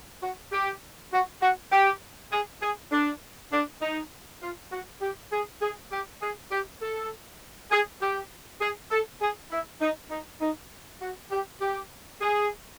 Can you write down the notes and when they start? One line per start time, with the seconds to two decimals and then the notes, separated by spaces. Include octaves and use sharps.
0.22 F#4
0.52 G4
1.13 F#4
1.42 F#4
1.72 G4
2.32 G#4
2.62 G#4
2.92 D4
3.52 D4
3.82 D#4
4.42 F4
4.72 F#4
5.01 G4
5.32 G#4
5.62 G#4
5.91 G4
6.22 G#4
6.51 G4
6.82 A4
7.72 G#4
8.01 G4
8.61 G#4
8.91 A4
9.21 G#4
9.51 E4
9.81 D#4
10.10 D#4
10.41 D#4
11.01 F#4
11.31 G4
11.61 G4
12.21 G#4